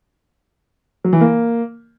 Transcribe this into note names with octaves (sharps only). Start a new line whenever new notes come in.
F#3
E3
A#3